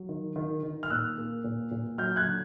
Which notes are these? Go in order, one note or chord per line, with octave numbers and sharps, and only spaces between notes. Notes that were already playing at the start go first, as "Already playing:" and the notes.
Already playing: F#3
D#3
D#3
D#3
F6
A#2 E6 F#6
A#3
A#2
A#2
F#3 F6 G6
F#6 G#6
D3